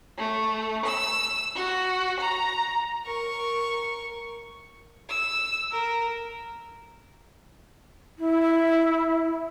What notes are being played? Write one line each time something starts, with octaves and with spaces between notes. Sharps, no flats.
A3
E6
F#4
A#5
A#4 C#6
E6
A#4
E4